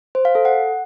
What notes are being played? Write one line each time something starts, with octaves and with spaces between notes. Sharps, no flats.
C5
F5
A4
F#5